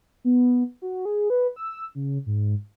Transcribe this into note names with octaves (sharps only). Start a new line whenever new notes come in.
B3
F#4
G#4
B4
E6
C#3
G#2